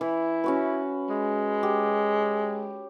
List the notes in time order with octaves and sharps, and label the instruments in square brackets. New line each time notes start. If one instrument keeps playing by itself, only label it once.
[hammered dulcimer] E3 [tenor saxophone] E4
[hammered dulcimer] C#4 F#4 B4
[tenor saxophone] G#3
[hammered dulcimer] G4